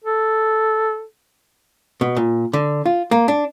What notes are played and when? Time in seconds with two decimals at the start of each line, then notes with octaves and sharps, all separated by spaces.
0.04 A4
2.01 B2
2.16 A#2
2.53 D3
2.85 F4
3.11 A#3
3.28 D4